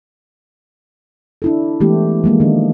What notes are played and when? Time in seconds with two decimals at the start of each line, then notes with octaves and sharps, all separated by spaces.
1.42 D4 E4 A4
1.80 E3 G#3 A3 B3 G4
2.24 F3 G#3 A#3
2.40 D#3 D4